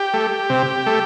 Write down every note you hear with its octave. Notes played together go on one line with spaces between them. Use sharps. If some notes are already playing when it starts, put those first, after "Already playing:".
Already playing: G4
A3
C3
A3